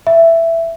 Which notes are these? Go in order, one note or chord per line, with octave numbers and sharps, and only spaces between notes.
E5